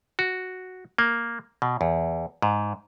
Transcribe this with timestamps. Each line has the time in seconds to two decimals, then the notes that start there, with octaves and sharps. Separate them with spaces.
0.19 F#4
0.98 A#3
1.62 B2
1.81 E2
2.42 G#2